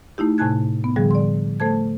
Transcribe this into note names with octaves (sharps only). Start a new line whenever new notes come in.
A3 D#4 E4 G4
A2 C3 G#5 A5 F#6 G#6
B3
A2 D3 F3 G3 G#4
D5 C6
A3 A4 C5 A5 G#6